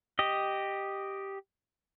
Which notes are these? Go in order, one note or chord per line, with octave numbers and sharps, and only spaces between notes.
G4 D#5